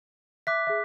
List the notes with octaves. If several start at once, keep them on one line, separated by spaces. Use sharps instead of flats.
E5 D6 F#6 B6
G#4 E5